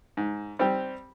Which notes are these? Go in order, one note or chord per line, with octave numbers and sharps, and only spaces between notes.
G#2
G3 C4 G4